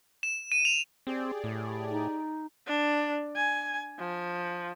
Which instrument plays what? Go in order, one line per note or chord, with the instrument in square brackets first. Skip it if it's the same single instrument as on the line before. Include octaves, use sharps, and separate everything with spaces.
[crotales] E7
D#7
F7
[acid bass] C4 [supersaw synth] G4 G#4 D5
[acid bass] A2
[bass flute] D#4
[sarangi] D4
G#5
F3